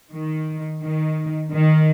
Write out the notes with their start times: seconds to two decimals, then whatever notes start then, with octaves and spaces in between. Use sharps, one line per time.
0.11 D#3
0.81 D#3
1.51 D#3